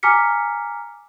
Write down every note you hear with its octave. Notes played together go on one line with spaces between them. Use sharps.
G#5 A#5 D6 F6 B6 C#7